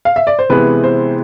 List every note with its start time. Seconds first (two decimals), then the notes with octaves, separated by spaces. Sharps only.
0.05 F5
0.16 E5
0.27 D5
0.39 C5
0.49 C3 E3 G#3 B3 B4
0.84 C5